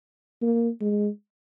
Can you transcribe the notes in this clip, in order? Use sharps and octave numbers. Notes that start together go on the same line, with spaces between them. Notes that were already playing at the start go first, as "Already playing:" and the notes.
A#3
G#3